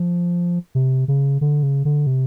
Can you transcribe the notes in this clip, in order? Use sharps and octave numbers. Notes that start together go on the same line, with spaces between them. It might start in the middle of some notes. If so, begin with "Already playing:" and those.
Already playing: F3
C3
C#3
D3
C#3
D3
C3